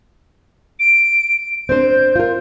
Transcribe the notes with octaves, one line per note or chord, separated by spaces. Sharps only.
D7
C4 D4 C5 G6
F4 A#4